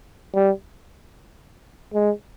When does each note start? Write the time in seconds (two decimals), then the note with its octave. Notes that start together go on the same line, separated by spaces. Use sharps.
0.34 G3
1.94 G#3